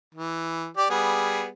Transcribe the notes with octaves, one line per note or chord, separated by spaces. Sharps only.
E3
G4 D5
G3 B3 G#4